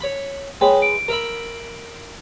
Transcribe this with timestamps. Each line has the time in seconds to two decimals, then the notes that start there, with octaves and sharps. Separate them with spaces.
0.01 C#5 B5
0.61 G#3 B4 C#5 G5
0.82 D7
1.08 A#4 E5 B5